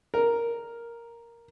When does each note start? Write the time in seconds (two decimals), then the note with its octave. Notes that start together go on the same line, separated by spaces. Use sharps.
0.14 A#4